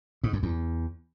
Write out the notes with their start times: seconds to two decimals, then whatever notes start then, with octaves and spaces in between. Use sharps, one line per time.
0.24 G#2
0.33 F#2
0.43 E2